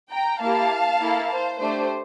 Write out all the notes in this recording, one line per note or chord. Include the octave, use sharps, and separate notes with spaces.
G5 A#5
A#3 E4 G4 F5 A5
A#3 E4 A4
C5
A3 D4 G4 C5